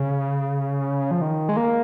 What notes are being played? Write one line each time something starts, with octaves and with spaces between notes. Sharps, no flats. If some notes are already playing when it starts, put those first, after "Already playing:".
Already playing: C#3
F3
D#3
G#3
A#3